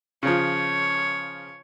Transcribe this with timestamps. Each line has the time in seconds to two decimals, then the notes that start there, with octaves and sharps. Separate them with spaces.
0.23 C#3 F3 C#5